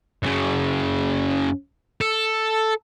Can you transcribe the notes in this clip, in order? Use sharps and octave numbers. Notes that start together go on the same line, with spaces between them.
F#2 C#3
A4